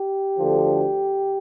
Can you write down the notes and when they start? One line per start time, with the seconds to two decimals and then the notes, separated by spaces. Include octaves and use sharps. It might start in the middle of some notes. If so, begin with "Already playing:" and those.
Already playing: G4
0.39 D2 D3 F3